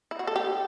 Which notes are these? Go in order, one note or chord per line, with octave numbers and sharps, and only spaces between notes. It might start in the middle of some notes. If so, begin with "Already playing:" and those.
E4
F#4
A4
G4